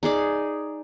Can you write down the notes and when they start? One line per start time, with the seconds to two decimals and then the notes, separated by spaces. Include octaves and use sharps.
0.03 D#4 G#4 D5